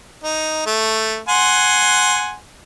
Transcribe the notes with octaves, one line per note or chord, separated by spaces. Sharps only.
D#4
A3
F#5 G#5 C6